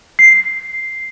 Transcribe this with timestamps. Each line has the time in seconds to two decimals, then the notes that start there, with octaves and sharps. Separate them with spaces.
0.19 C7